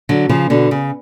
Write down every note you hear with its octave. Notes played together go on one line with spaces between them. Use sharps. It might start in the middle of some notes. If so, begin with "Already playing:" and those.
D3 F#3
C#3 F3
B2 D3
C#3